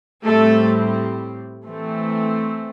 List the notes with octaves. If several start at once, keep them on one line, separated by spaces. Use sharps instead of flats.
A2 G3 A3 C4 A4
E3 A3 C4